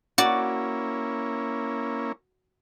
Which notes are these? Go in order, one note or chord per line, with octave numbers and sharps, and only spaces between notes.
A#3 C#4 E4 F#4 D5